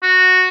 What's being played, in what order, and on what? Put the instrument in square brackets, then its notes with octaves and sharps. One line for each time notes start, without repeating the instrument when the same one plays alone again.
[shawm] F#4